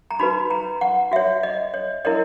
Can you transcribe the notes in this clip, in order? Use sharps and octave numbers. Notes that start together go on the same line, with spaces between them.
A#5
D#4 F#4 B4 B5
A#5
F#5
F#4 C#5 E5
D#5
C#5
E4 A#4 C#5 D#5